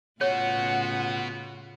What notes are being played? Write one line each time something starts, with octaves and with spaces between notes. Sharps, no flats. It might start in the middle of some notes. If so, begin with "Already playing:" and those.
A2 C#3 B3 F4 F#4 C#5 F#5